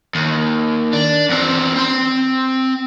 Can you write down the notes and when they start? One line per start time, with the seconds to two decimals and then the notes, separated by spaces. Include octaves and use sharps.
0.15 D#2
0.93 D4
1.29 E2 C4
1.76 C4 C6